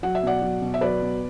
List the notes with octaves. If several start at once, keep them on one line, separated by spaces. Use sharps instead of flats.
F#3 F#5
E5
B2 D5 F#5
F#3
B2
E5
F#3 B4 D5
B2